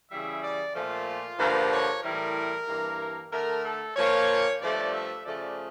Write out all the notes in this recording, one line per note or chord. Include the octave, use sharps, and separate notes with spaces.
C#3 E3 G3 E5
D5
A#2 F3 A3 F4
G2 D3 F3 A#3
C#5
A2 E3 G3 A#4
G2 E3 A#3
D3 A3 A#4
A4
A#2 F3 A#3 C#5
G2 F3 A3 D5
E5
C#3 F3 A3 D5